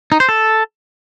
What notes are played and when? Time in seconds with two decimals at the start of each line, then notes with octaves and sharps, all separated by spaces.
0.12 D#4
0.20 C5
0.29 A4